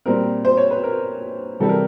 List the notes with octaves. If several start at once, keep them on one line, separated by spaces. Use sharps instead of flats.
A#2 G3 C4 A#4
C5
C#5
B4
A#4
C3 E3 G3 A4
A#4